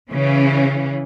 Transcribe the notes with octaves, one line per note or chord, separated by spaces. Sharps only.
C#3 E3 C#4